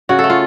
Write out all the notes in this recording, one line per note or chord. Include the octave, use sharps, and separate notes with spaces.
C#3 F#4
A4
A3
F4